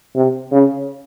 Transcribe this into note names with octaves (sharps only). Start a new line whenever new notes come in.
C3
C#3